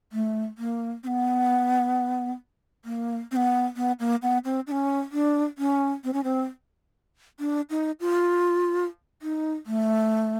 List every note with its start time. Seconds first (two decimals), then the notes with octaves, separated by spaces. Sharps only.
0.12 A3
0.58 A#3
1.03 C4
1.07 B3
2.85 A#3
3.32 C4
3.36 B3
3.76 B3
4.00 A#3
4.22 B3
4.44 C4
4.67 D4
4.72 C#4
5.12 D4
5.58 C#4
6.04 C4
6.13 C#4
6.24 C4
7.40 D4
7.70 D#4
8.00 F4
9.22 D#4
9.66 A3